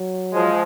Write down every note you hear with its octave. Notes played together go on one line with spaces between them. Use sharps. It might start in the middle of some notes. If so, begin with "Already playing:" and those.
Already playing: F#3
F3 G#3